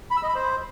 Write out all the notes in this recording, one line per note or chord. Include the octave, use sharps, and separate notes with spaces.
B5
E6
D#5
B5
C5